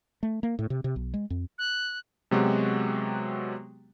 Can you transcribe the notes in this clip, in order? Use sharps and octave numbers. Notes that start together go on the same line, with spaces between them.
A3
A#3
A2
C3
C3
B1
G#3
F2
F#6
C3 F#3 G#3 B3 F#4 G4